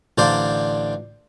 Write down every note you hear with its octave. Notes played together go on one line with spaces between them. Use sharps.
A1 D3 C5 D5 F5